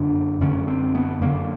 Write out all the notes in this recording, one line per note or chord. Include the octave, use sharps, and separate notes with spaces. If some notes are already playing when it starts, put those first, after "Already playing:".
Already playing: F#2 D3 D4
F#2 D3 C#4
C4
B3
F#2 D3 A#3